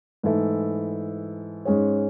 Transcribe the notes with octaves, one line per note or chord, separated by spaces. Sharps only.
G#2 E3 A3 E4 A4
G#2 G#3 C#4 G#4 C#5